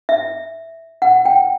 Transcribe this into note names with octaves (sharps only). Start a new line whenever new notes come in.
E5
F#5
G5